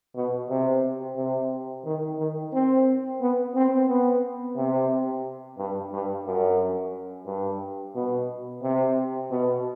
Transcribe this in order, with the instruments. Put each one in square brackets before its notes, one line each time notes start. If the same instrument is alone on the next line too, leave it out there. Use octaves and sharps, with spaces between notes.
[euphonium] B2
C3
C3
D#3
D#3
C4
B3
C4
B3
C3
G2
G2
F#2
G2
B2
C3
B2